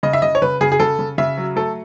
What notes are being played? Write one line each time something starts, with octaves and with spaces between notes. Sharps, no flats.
C#3 D#5
E5
C#3 D#5
C#5
C#3 B4
C#3 G#4
G#4
C#3 A4
C#3
C#3 E5
F#3
A3 A4